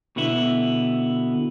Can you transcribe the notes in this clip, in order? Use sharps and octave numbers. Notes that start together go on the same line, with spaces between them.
B2 D3 B3 E4